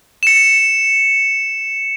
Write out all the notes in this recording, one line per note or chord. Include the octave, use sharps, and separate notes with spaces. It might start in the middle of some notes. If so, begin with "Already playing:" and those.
C#7 E7